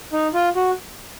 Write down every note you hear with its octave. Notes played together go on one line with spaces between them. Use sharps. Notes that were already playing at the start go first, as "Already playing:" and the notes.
D#4
F4
F#4